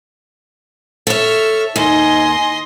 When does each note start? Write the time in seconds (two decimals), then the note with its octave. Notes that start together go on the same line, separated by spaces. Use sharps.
1.07 A4 C#5 E5 F6
1.76 D#2 D#4 D#5 G#5 C6